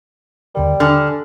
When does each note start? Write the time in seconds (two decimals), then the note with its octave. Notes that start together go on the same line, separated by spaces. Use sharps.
0.55 D#2 D3 G3 A#4
0.80 D3 G#5 F6